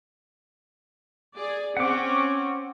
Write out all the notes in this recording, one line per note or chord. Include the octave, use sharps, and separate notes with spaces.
G#4 D5
C4 C#4 F#5 D6